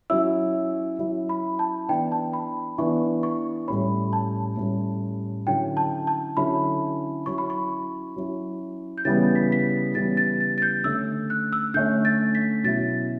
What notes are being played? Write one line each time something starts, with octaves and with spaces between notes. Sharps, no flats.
F#3 C#4 E4 E6
F#3 C#4 E4
B5
A5
E3 B3 D4 G5
A5
B5
E3 B3 D4 C#6
C#6
A2 G3 C#4 B5
A5
A2 G3 C#4
D3 F#3 C#4 E4 G5
A5
A5
D3 F#3 C#4 E4 B5
F#3 C#4 E4 C#6
B5
C#6
F#3 C#4 E4
G6
C#3 E3 G3 B3 A6
B6
B6
C#3 E3 G3 B3 A6
A6
A6
A6
G6
D3 A3 C#4 E6
F#6
E6
D3 A3 C#4 G6
A6
B6
B2 F#3 C#4 E4 A6